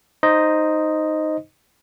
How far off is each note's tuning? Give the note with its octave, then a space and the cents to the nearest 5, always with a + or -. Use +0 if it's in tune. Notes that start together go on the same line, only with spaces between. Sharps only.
D#4 +0 C5 +0 D#5 +0